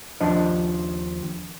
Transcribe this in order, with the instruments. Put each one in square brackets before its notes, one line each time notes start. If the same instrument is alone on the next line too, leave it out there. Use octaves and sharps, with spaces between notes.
[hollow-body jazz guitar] D#2 F3 D4 D#5